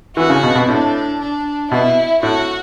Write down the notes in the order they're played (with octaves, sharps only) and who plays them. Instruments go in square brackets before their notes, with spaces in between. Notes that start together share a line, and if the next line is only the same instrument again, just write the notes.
[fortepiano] E3 [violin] F#4
[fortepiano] C#3
B2
B2
[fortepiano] A2 [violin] D4
[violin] D4
[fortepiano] B2 [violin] E4
[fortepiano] A2 [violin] F#4